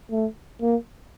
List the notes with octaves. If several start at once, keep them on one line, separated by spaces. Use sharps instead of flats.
A3
A#3